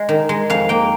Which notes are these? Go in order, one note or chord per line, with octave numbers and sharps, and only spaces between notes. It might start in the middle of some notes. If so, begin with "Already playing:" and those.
Already playing: G#3 D#5
D#3
G#3
F2 F5
A#3 G5